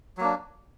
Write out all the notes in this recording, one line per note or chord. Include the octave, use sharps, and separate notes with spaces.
F#3 A#3 D4